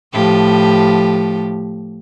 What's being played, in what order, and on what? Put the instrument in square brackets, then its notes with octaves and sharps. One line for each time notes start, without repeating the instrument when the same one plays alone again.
[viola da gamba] A2 F3 G4